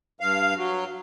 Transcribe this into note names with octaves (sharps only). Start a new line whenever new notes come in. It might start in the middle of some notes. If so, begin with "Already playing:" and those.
G2 F5
F#3